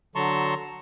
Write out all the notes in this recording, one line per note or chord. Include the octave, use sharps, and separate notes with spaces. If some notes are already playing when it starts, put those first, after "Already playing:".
D3 F#3 A5 A#5 C6 C#6